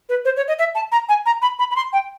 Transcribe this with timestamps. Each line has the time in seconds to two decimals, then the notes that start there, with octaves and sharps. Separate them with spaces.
0.09 B4
0.25 C5
0.37 C#5
0.48 D#5
0.59 E5
0.75 A5
0.92 A#5
1.09 G#5
1.26 A#5
1.42 B5
1.59 B5
1.71 B5
1.76 C6
1.93 G5